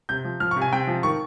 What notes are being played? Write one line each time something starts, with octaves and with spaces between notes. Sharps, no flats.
C3 G6
F3
F3 F6
C#6
C3
G#5
C3 G5
F3
D#3 C#6